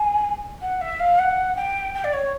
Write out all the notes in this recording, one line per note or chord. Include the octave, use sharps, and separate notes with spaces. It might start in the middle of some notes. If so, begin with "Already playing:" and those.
Already playing: G#5
F#5
E5
F5
F#5
G5
G5
D5
C#5